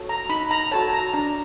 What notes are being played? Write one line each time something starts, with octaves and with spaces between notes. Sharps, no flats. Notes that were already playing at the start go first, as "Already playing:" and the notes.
Already playing: F#4 A4 C#5
A#5
D#4 B5
A#5
F#4 A4 C#5 A5
A#5
D4 A#5